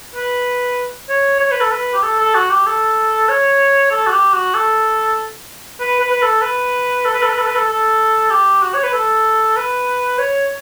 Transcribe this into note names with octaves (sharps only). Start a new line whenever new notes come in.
B4
C#5
C#5
B4
A4
B4
G4
A4
A4
F#4
G4
A4
C#5
A4
F#4
G4
F#4
A4
B4
B4
B4
A4
B4
A4
B4
A4
B4
A4
B4
A4
A4
G4
F#4
C#5
B4
A4
B4
C#5